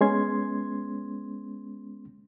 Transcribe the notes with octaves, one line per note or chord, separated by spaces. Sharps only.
G#3 B3 C#4 C6 G#6